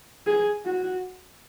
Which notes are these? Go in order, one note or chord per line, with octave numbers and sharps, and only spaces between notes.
G#4
F#4